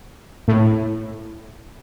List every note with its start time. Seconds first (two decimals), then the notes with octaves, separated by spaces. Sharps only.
0.48 A2